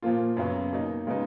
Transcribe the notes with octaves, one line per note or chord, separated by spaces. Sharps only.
A#2 F3 A#3 F4
F#2 C#3 F#3 B3
B2 A#3 D#4
C#3 G#3 B3 D#4